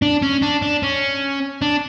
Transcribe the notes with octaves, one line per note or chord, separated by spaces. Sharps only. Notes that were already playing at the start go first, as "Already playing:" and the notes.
D4
C#4
D4
D4
C#4
D4